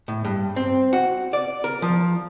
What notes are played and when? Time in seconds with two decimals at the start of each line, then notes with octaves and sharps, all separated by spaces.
0.08 A2
0.25 G2
0.56 C4
0.93 F#4
1.33 D5
1.64 A#4
1.82 F3